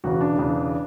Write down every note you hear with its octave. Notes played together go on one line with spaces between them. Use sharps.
E1 E2 C#3 F#4
D4
E1 E2 C#3